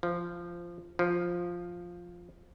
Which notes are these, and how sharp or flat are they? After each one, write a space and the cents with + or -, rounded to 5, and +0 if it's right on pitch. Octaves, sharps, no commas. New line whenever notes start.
F3 -10
F3 +5